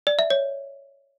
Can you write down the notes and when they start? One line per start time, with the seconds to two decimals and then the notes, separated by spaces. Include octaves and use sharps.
0.07 D5
0.19 E5
0.30 C#5